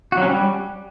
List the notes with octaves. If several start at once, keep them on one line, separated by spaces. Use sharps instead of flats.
F#4
F#3
C#4
G3